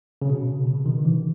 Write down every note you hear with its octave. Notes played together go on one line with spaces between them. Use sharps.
C#3
B2
C#3
D#3
E3